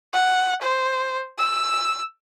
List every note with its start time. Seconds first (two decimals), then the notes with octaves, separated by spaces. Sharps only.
0.14 F#5
0.62 C5
1.38 E6